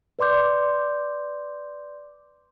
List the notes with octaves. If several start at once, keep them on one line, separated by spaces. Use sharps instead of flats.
B4 D5 C6 D6 G6